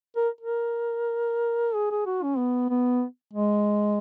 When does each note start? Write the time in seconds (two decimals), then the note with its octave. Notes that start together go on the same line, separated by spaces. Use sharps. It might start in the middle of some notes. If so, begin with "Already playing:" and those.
0.16 A#4
0.41 A#4
1.75 G#4
1.91 G#4
2.06 F#4
2.23 C#4
2.38 B3
2.70 B3
3.34 G#3